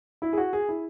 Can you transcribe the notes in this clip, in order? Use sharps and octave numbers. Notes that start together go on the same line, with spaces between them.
E4
G#4
F#4
G#4
E4